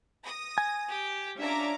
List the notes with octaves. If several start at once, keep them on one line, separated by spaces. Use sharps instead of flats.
D#6 A#6
G#5
G4 G5
C#4 D4 F4 E5 A#5 D6